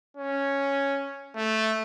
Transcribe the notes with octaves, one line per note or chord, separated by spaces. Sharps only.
C#4
A3